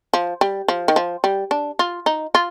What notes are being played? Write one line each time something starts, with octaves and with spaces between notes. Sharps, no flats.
F3
G3
F3
D#3
F3
G3
D4
F4
D#4
F4